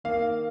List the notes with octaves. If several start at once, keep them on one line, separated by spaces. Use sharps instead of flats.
D#3 A#3 F5